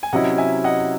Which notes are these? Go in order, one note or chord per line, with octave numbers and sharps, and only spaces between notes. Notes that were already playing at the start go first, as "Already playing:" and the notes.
G#5
C3 F#3 C#4 E4 D#5 F#5
E5 G#5
D#5 F#5